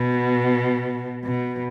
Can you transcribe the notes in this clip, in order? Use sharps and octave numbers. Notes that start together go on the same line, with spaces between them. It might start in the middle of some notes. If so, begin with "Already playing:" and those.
Already playing: B2
B2